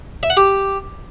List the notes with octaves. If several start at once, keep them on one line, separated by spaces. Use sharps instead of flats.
E5
F#5
G4